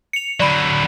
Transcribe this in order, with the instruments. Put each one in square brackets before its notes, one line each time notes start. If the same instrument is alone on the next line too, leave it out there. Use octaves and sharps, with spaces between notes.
[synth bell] C#7 F7
[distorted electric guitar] D3 F#3 [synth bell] D5 B5